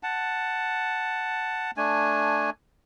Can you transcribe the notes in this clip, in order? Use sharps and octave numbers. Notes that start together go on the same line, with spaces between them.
F#5 A5
A3 D4 G#5